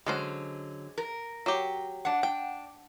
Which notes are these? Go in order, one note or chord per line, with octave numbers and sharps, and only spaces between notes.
D3 F#3 G#3 C#4 C5
A#4
F#3 G4
D4 F#5
D4 G5